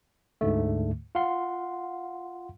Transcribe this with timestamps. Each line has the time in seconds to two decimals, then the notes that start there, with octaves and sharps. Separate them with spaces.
0.41 D2 G#2 D3 A3
1.15 F4 F5 F#5 C6